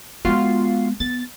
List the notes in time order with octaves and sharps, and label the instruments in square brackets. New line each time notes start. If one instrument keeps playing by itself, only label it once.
[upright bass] G#3 B3 [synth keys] F4 F#4 C7
[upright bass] B3 [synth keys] A6